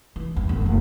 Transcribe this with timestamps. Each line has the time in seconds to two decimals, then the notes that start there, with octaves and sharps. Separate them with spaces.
0.16 E3
0.36 E2 G2
0.49 G1
0.61 F1 D#2